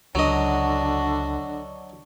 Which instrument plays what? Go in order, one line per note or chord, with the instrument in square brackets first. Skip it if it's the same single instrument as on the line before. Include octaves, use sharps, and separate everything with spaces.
[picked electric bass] C#2 [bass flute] D3 [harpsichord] F#3 D#5 [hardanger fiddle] D4 F#4